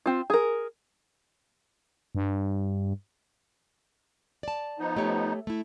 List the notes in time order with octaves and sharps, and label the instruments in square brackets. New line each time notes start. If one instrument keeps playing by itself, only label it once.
[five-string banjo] C4 F4
G#4 A#4
[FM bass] G2
[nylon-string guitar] D5 A5
[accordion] F3 B3 D#4
[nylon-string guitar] A3 G4 C#5
A3 E4